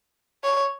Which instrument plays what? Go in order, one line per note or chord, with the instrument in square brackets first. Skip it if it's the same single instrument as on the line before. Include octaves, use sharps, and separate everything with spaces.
[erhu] C#5